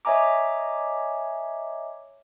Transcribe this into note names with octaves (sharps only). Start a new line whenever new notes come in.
C#5 D#5 E5 G#5 A#5 D6